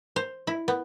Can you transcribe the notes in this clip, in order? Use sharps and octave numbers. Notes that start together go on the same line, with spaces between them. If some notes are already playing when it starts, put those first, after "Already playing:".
C5
E4
B3